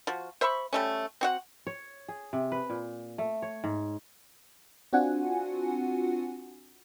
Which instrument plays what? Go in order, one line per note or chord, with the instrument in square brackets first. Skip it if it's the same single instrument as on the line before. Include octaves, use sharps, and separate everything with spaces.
[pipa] F3 F#4
C5 E5 B5 C#6
G3 A3 C#4
C4 F#4 F#5
[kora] C#5
G#4
C3
B4
A#2
A3
C#5
G#2
[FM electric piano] C4 D4 F4 F#4 F#5 G#5